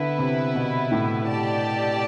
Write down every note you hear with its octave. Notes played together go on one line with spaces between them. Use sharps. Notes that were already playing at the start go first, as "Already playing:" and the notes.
Already playing: D3 B3 E4 B4
C3
B2
A2
G4 D5 A5